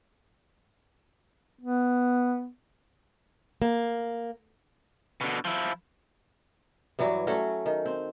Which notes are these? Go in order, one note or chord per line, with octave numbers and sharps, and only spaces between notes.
B3
A#3
B2 D3
F3 E4
G2 E3 F#3 G3
F#3 A3 C#4 F#4
D#3
C4